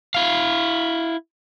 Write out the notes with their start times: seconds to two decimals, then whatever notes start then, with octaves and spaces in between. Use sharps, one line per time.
0.14 E4 F5